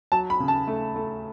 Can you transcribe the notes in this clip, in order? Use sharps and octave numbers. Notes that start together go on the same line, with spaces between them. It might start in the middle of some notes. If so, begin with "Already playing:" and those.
F#3 A5
B5
C#3
A5
A3
A3